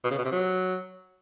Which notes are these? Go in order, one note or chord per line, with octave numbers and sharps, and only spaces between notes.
B2
C#3
B2
C3
F#3